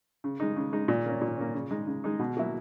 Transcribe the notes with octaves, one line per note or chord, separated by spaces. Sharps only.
C#3
G#3 D#4
C#3
G#3 D#4
A#2
A#3 C#4
A#2
A#3 C#4
C#3
G#3 D#4
C#3
G#3 D#4
B2
F#3 A#3 E4